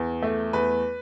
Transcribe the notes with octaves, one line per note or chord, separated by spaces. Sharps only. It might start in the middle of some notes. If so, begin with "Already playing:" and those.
Already playing: E2
A3
E2 B4